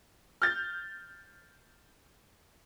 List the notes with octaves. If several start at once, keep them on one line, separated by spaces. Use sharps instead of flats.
F6 G6 A6